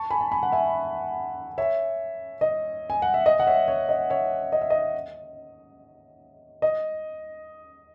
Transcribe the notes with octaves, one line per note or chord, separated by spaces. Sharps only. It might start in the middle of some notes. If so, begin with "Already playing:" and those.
Already playing: A5 C#6
G#5 B5
A5
G#5 B5
F#5
E5 G#5
C#5 E5
D#5
G#5
F#5
E5
D#5
F#5
C#5 E5
C#5
D#5
C#5 E5
D#5
E5
D#5
D#5